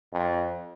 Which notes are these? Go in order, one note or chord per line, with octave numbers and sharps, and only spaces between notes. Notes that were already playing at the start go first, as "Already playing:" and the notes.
F2